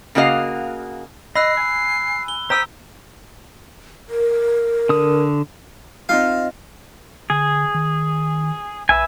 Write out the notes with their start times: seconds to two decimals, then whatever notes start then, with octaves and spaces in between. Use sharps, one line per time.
0.15 C#3 A#3 F#4 D#5 F5
1.35 D#5 B5 E6 F#6 C7
1.57 G#5
2.28 G7
2.50 C5 G5 A#5 D#6 E6 B6
4.09 A#4
4.89 D3 D#6
6.09 C4 D#4 F4 F5
7.30 D3 G#4
7.74 D#3
8.89 B1 B4 E5 G#5